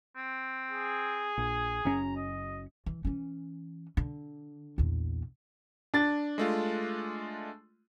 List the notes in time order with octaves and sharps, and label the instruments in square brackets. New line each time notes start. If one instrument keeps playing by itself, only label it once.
[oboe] C4
[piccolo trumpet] G#4
[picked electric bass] A#1
[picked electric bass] F#1 F#2 C#4 [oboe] A#5
[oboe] D#5
[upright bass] E3
E3 C#4
D3
A#1 E2
[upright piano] D4 A6
[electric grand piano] G#3 A3 F4